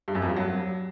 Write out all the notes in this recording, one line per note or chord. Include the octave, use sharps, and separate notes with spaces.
G2
F#2
F2
G2
F#3